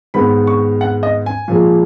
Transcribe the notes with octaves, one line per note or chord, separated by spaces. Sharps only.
G#2 D#3 G#3 B3 B5
C#6
F#5
D#5
G#5
A#2 F3 G#3